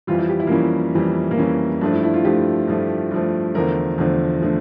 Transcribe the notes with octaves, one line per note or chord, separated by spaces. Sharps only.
F2 E3 G3 F4
E4
G4
E4
A#3
F2 E3 G3 C#4
F2 E3 G3
A#3
F2 E3 G3 C#4
G2 F3 A3 D4
E4
E4
F4
G2 F3 A3 G4
G2 F3 A3
G2 F3 A3
E2 D3 F3 A3 A#4
E2 D3 F3 A3
D3 F3 A3